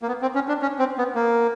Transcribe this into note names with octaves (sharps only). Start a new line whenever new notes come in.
A#3
B3
C4
C#4
D4
C#4
C4
B3
A#3